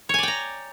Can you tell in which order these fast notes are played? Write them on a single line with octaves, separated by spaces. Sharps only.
C#5 G#5 D5 G5 A#5